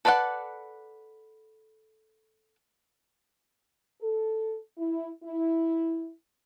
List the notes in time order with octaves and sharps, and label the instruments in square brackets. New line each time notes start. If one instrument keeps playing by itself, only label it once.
[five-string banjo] A4 B4 D5 F5 F#5
[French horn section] A4
E4
E4